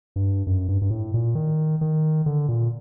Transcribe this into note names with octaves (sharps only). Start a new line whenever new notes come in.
G2
F#2
G2
G2
A2
A#2
D#3
D#3
D3
A#2